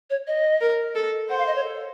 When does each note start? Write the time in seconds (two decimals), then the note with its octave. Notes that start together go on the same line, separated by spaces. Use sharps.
0.10 C#5
0.27 D#5
0.61 A#4
0.95 A4
1.29 C5 F#5
1.38 F5
1.46 D#5
1.55 C#5
1.64 A4